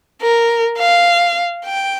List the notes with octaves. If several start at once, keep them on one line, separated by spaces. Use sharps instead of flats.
A#4
F5
G5